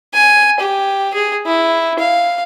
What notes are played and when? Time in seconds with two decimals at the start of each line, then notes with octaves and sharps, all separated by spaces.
0.14 G#5
0.60 G4
1.14 G#4
1.46 E4
1.99 F5